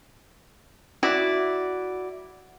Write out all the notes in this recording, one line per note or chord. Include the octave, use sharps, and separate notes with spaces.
E4 F#4 D5